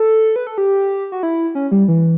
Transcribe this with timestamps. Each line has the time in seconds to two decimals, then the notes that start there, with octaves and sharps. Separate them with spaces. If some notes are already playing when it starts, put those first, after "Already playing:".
Already playing: A4
0.36 B4
0.47 A4
0.58 G4
1.12 F#4
1.23 E4
1.55 C#4
1.71 G3
1.88 E3